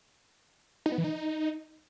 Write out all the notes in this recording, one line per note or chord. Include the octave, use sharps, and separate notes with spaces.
D#4
B3
E3
D#4